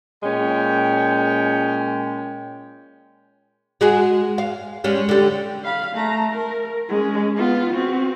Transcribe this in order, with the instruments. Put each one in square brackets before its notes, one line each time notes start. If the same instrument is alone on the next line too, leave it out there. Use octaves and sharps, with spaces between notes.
[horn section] A#2 G#3 C#4 G5
[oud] G#3 F#4 G#4
F5
G3 G#3 C#4
D3 G3
[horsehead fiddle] F5 B5
A3 A#5
A#4
G#3 C#4
B3 F4
C4 F#4